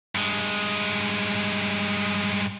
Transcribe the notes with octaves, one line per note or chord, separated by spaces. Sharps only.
G2 G#3